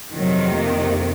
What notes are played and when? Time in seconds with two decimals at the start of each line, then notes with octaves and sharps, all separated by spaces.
0.15 F2 C3 D#3 F#3
0.52 A#3